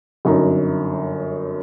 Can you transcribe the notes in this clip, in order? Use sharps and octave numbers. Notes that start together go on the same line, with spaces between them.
G1 F#2 D#4